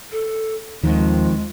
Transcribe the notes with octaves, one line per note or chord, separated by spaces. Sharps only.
A4
D#2 D#3 F3 G#3 C4